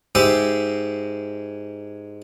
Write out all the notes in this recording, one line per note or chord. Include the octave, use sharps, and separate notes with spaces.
G#2 G#3 G4 E5